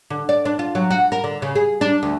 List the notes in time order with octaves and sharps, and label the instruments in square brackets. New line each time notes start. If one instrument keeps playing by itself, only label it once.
[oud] D3
D5
D4
F4
F#3
F#4
A#4
D3
C#3
G#4
D4
D2